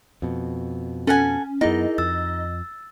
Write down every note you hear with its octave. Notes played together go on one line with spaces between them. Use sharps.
F2 B2
C#4 A4 F#5 G#5
F#2 B3 D#4 E4 G#4 A#4 D#5
F2 E6 A6